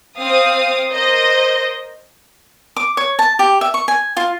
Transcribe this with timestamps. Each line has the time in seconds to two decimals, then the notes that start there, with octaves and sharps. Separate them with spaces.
0.18 C4 F5 D#6
0.90 A#4 C5 D#5
2.76 D6
2.97 C#5
3.19 A5
3.39 G4
3.61 E5
3.74 C#6
3.88 G#5
4.17 F4